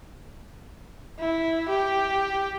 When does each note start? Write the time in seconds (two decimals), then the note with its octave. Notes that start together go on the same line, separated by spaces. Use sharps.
1.20 E4
1.69 G4